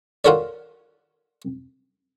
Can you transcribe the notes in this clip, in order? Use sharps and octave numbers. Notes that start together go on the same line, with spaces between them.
F4 F#4 A4 A#4 C#5 D5